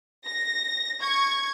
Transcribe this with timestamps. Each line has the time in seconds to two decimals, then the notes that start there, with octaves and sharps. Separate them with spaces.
0.24 A#6
1.01 C#6 G#6